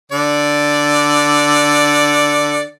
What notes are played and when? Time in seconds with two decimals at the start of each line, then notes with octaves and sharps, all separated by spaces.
0.12 D3 D5